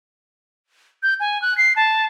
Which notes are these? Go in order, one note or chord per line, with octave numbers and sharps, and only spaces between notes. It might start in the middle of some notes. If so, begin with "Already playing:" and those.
G6
G#5
F#6
C7
A5